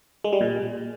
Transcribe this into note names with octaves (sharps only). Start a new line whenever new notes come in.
G#3
G3
A#2